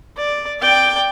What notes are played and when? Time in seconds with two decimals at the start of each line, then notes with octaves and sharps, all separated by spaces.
0.17 D5
0.60 D5 G5